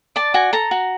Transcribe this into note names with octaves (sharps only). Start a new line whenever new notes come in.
D5 A5
F#4 G#5
A4 A#5
F#4